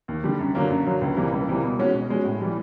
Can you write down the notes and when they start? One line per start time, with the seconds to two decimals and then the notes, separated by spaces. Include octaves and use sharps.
0.08 D#2
0.24 D3 G3
0.39 F#2
0.55 D3 F#3 A#3
0.70 F#2
0.86 D3 F#3 A#3
1.01 C#2
1.17 C3 E3 G3 A#3
1.32 C#2
1.48 C3 E3 G3 A#3
1.63 B2
1.79 G#3 C#4 F#4
1.95 B2
2.10 G#3 C#4 F#4
2.25 A2
2.41 E3 G3